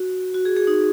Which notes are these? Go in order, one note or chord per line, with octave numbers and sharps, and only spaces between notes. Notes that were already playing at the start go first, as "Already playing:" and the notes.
Already playing: F#4
F#4
G#4
G#4
D#4